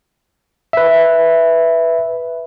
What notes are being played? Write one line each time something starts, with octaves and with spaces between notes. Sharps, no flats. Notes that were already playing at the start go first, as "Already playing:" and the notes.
B4 E5